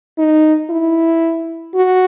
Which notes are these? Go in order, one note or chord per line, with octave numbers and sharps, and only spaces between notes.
D#4
E4
F#4